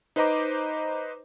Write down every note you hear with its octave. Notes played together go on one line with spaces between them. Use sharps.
D#4 B4 C5 D#5 A#5 D6